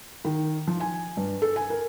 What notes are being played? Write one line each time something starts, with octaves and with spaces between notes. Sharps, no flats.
D#3
F3
G#5
G2
A4
G#5
A#4